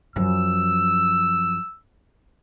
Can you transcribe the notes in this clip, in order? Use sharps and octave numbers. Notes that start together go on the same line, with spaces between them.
F#2 F3 E6